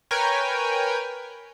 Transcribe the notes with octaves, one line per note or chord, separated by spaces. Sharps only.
A#4 B4 C#5 G5 G#5